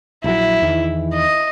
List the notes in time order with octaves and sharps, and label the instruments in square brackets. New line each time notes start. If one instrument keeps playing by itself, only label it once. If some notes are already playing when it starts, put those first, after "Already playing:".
[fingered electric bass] A#1 F#3 [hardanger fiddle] E4
[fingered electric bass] E2 D#3 E3
[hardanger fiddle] D#5